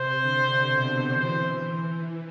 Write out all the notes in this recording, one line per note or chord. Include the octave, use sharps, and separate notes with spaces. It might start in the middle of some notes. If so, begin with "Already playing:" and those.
Already playing: C3 C5
D3
B2
E3 C5